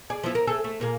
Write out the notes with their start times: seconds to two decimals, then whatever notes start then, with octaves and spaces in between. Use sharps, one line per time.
0.10 G#4 D5
0.24 F3 B3 E4
0.35 A#4
0.47 A3 G#4 A4
0.64 A3
0.80 A#2 A#3 G#4